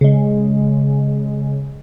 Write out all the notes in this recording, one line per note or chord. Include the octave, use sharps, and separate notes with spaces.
C#3 G#3